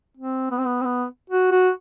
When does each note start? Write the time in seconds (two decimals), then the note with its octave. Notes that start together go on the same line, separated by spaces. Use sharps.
0.17 C4
0.51 B3
0.58 C4
0.66 B3
0.81 C4
0.85 B3
1.30 F#4
1.51 F#4